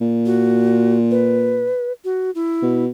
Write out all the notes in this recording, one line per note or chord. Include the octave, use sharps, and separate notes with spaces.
A#2
F#4
B4
F#4
E4
B2